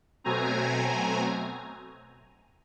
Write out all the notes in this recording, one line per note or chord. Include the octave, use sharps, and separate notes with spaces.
B2 F#3 A3 C4 G#5 A#5
G#5 A#5